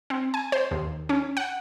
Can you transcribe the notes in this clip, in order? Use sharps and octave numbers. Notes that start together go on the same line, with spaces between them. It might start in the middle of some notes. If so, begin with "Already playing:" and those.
C4
G#5
C5
D#2
C#4
F#5